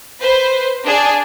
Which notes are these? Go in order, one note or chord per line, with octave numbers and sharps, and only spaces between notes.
B4 C5
D4 G#4 D5